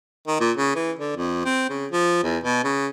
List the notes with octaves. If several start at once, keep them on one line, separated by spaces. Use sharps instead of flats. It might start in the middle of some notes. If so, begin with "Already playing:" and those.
D#3
A#2
C#3
E3
D3
F2
C4
C#3
F3
E2
B2
C#3